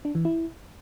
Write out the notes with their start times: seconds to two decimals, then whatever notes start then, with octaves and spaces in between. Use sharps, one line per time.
0.05 D4
0.15 E3
0.25 E4